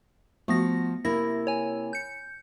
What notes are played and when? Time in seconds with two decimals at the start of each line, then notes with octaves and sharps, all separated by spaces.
0.48 F3 A3 B3 F#4 A#6
1.05 C3 A#3 E4 A#6
1.47 C#5 G#5
1.93 G6 C#7